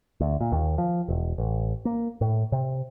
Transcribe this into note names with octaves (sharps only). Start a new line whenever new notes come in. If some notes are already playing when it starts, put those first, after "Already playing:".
D2
A#2
D#2
F3
E1
A1
A#3
A2
C3